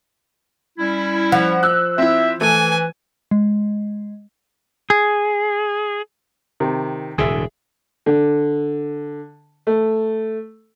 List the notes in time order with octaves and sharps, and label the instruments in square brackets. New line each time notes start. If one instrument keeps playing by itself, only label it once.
[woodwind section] G3 C#4 E4
[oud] F3 [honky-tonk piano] F#5
[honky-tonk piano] E6 F#6
[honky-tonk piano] C4 E4 [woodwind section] E5
[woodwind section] E3 [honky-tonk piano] A3 [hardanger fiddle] G#5
[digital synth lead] G#3
[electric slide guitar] G#4
[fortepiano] C3 D#3
[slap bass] E1 A2 D3 [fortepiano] G#4 E5
[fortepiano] D3
A3